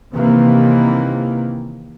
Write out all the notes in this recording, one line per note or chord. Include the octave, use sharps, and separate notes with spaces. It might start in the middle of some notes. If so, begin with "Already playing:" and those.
C3 D#3 E3 A#3